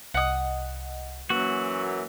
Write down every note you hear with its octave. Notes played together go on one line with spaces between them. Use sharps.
C2 D#5 F#5 D#6
F#2 E3 F#3 A#3 F#4